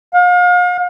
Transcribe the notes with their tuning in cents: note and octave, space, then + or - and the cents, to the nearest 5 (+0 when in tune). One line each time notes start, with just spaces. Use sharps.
F5 +40